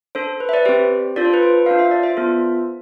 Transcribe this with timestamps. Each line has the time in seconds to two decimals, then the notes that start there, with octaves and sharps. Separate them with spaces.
0.15 D4 A4 C5
0.40 B4
0.49 E5
0.53 B4 D5
0.65 C4 G4 C5
1.16 D4 F4 A4 D5
1.25 C5
1.34 B4
1.42 C5
1.66 D4 F4 A4 F5
1.79 E5
1.91 D5
2.03 C5 E5
2.17 B3 F4 A4